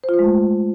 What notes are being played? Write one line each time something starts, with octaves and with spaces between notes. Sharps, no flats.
C5
F4
C5
G#3
A3